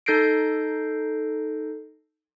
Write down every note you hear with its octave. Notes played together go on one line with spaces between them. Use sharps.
D#4 A4 G6 A#6 C7 D7